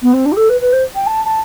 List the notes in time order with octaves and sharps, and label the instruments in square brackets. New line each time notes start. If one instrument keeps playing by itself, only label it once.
[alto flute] B3
C4
D4
G4
A4
B4
B4
C5
G5
A5
A5